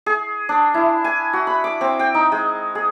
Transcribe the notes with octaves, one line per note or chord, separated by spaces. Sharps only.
G#4
D4
E4
G#5
F#4
B5
D6
C4
G5
D#4
G#3
G#4